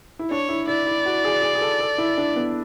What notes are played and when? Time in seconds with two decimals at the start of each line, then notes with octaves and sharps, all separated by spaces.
0.19 E4
0.31 D4 C#5
0.49 E4
0.67 E4 D5
0.87 E4
1.06 F#4
1.25 G#4
1.42 G#4
1.55 G#4
1.61 A4
1.80 A4
1.98 E4
2.18 D4
2.36 B3